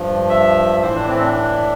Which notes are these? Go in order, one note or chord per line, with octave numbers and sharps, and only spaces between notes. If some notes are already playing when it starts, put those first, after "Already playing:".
Already playing: G2 F3
E5
A2 E3 C5
D4
C4
D4
D4